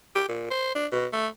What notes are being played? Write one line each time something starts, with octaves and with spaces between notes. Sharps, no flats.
G4
A#2
C5
D4
B2
A3